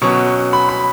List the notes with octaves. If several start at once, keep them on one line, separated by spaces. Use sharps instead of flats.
B2 F#3 C#4 C#6
C#6
B5
B5